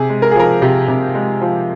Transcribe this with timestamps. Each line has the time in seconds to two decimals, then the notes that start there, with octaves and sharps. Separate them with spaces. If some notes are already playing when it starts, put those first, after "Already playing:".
Already playing: C3 G#4
0.09 G#3
0.22 A#4
0.31 G#4
0.36 F3 A#4
0.62 C3 G4
0.88 C3
1.15 G#3
1.42 F3